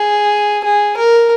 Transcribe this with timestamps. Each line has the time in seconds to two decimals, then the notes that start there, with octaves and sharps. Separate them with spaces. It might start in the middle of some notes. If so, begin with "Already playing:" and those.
Already playing: G#4
0.64 G#4
0.97 A#4